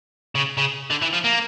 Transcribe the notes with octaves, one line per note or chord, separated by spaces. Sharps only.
C#3
C#3
D3
E3
F3
A#3